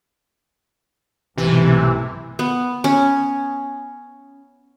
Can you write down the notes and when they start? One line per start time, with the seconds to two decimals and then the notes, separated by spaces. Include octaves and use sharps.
1.37 B1 G#2 C3 E3 A3
2.39 B3
2.84 C#4